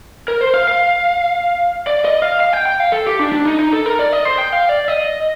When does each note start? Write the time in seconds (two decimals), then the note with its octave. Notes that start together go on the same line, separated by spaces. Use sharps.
0.28 A#4
0.41 C5
0.54 F5
0.67 F5
1.87 D5
2.05 D#5
2.22 F5
2.40 F5
2.53 G5
2.66 G5
2.80 F5
2.92 A4
3.07 G4
3.19 D4
3.32 D4
3.45 D#4
3.59 D#4
3.73 A4
3.86 A#4
3.99 D5
4.12 D#5
4.25 C5
4.38 G5
4.52 F5
4.69 D5
4.88 D#5